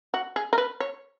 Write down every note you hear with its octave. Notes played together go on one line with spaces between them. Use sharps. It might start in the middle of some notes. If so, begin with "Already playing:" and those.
F#4
G#4
A#4
B4
C#5